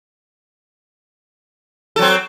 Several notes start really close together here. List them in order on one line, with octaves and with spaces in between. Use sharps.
A4 F#3 C4